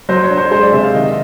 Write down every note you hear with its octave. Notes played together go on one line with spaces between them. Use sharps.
F#3 C5
C#5
D4
C5
G#3 C5
D5
C3 E5
F5
D#3 D#5